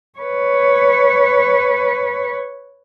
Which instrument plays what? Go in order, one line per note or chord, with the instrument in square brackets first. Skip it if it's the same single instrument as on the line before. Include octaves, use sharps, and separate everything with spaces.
[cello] B4 C#5